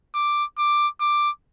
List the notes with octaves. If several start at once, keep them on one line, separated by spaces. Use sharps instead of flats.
D6
D6
D6